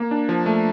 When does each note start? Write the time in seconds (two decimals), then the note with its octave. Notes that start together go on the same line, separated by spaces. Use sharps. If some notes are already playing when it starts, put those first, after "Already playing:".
Already playing: A#3
0.11 D4
0.29 F3
0.46 A3